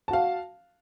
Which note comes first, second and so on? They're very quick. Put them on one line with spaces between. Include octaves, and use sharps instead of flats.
A5 F#4 F5